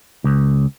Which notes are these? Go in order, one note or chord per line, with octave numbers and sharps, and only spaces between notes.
C#2